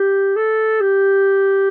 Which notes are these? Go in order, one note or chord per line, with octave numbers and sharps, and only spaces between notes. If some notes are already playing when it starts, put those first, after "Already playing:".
Already playing: G4
A4
G4